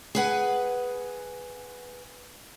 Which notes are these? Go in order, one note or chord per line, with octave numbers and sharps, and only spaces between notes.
G#4 B4 F#5 G#5